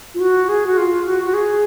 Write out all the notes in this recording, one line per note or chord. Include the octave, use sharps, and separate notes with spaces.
F4
F#4
G#4
F#4
F4
F#4
F#4
G#4